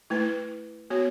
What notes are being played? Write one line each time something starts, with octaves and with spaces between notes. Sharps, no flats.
A3 E4 B4
B3 F#4 C#5